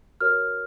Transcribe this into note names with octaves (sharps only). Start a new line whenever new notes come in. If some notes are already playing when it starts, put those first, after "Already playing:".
F#4 A#4 C#5 F6